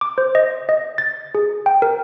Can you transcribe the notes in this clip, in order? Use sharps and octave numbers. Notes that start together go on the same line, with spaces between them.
D6
C5
D#5
D#5
A6
G#4
G5
A#4